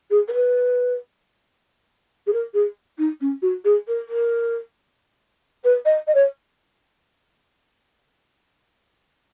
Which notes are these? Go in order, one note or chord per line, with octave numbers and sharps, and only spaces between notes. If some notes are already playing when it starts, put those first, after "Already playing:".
G#4
A#4
B4
G#4
A#4
G#4
D#4
C#4
F#4
G#4
A#4
A#4
B4
D#5
D#5
C#5